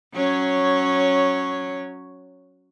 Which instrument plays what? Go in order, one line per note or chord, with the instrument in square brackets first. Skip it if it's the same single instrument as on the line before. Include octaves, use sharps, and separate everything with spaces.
[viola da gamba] F#3 C#4 C#5